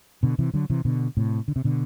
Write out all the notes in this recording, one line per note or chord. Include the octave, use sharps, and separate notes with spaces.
B2 D3
C3 E3
D3 F#3
C3 E3
B2 D3
A2 C3
D3
C3
B2 D3